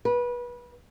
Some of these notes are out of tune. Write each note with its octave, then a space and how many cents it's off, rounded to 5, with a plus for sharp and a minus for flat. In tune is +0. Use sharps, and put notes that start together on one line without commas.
B4 -25